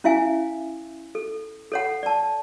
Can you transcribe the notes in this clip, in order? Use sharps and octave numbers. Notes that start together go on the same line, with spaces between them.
C#4 E4 E5 F5 G#5
A4
A4 C#5 F#5
D5 A5